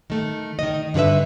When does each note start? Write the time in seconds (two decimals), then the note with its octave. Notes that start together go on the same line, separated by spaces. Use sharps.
0.10 D#3 A3
0.59 D#3 D#5
0.94 G2 D3 F#4 B4 E5